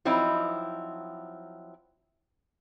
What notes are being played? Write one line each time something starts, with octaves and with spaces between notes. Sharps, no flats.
F3 F#3 C4 D#4 E4